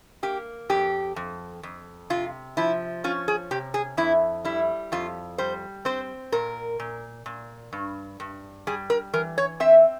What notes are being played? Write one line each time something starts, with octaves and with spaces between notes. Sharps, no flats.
A#3 G4
F2 G4
F2
F2
C3 F4
F3 E4
C#4 F4
G#4
C3 G4
G#4
F2 E4
G3 E4
F2 F4
G3 C5
C4 C5
A#2 A#4
A#2
A#2
G2
G2
G3 G#4
A#4
E3 A#4
C#5
C4 E5